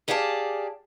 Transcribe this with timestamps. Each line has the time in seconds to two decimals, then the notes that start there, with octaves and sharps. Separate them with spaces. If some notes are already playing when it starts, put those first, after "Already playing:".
0.08 G4 G#4 D5 F5 F#5 A5